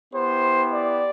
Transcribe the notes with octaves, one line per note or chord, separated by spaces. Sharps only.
B3 E4 G4 C5
D5